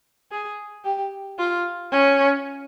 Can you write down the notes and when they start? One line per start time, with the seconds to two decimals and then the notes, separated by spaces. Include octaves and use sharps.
0.32 G#4
0.85 G4
1.39 F4
1.92 C#4